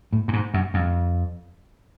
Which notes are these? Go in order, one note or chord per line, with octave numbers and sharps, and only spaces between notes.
A2
G2
G#2
F#2
F2